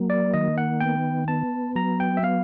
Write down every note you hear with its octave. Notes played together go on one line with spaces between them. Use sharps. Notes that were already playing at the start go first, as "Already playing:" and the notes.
Already playing: F#3 A#3
D5
D#3 D#5
F#5
B3 G5
B3 A5
F#3 A#5
G5
E5
B3 F5